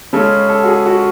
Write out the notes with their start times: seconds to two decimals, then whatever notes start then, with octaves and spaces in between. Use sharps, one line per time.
0.13 C#3 G#3 C#4 A4
0.49 A4
0.63 F#4
0.67 G#4
0.85 F#4